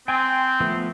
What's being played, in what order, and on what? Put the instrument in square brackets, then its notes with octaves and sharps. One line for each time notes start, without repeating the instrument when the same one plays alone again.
[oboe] C4 [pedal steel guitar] G5 G#5 C6
[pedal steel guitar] F3 A3 B3